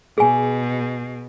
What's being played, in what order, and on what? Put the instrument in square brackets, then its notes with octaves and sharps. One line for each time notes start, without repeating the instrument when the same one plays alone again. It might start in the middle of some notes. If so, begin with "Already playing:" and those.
[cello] B2 [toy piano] G#4 G#5